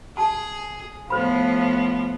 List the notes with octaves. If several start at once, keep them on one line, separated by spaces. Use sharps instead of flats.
G#4 A5
A2 F3 B3 C5 B5